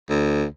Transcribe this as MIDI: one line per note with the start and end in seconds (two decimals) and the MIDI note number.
0.10 0.45 38